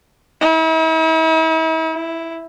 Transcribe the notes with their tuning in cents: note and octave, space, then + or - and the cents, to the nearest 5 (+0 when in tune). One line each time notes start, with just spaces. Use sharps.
E4 -45
E4 +0